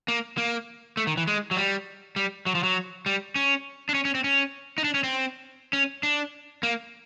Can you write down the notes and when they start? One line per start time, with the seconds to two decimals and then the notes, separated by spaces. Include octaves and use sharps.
0.08 A#3
0.38 A#3
0.97 A3
1.07 D#3
1.17 E3
1.27 G#3
1.51 F#3
1.57 G3
2.16 G3
2.46 F#3
2.55 F3
2.63 F#3
3.06 G3
3.36 C#4
3.89 D4
3.94 C#4
4.05 C#4
4.15 C4
4.24 C#4
4.78 D#4
4.84 D4
4.94 C#4
5.04 C4
5.73 C#4
6.03 D4
6.63 A#3